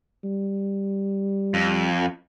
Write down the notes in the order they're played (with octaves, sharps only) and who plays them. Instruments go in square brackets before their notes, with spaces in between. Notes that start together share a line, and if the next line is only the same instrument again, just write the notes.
[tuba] G3
[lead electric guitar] F2